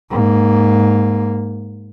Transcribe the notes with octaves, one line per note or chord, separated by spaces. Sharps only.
G#2 A#3